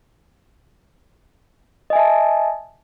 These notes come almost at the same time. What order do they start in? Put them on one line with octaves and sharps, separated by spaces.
D#5 G#5 E5 A5